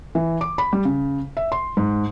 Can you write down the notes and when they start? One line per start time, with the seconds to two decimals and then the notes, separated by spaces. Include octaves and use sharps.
0.15 E3
0.41 D6
0.58 B5
0.73 G3
0.85 C#3
1.37 E5
1.52 C6
1.77 G#2